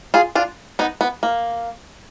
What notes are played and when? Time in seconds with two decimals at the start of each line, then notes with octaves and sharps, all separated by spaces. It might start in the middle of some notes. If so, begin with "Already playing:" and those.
0.14 F4 G#4
0.35 D4 F4
0.79 B3 D#4
1.01 B3
1.23 A#3